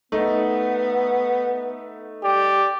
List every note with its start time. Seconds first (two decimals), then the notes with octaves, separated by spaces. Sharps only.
0.12 A3 B3 D#4
2.24 G4 D5